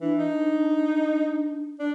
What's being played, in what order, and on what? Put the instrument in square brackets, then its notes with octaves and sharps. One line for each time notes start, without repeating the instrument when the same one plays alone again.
[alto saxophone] E3 [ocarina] D4
[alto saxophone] D#4
D4